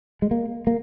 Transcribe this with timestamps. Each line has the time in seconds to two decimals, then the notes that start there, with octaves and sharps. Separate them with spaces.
0.22 G#3
0.31 A#3
0.67 A#3